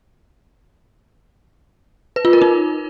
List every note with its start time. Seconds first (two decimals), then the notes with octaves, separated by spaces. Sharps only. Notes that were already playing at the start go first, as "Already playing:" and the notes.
2.16 B4
2.25 F4
2.33 A#4
2.42 D#4